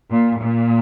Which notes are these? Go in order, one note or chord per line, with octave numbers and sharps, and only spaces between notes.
A#2
A#2